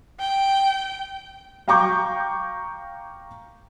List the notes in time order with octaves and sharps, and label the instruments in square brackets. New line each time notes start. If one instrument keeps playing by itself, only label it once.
[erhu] G5
[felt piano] F5 G5 A#5 C#6 D6 G6